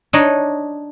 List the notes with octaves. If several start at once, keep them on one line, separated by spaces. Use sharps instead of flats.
D4 D#4 C#5 D#5